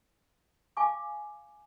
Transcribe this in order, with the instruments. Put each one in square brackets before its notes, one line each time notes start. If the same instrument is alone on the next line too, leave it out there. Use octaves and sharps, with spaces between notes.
[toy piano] F5 G#5 C#6 D6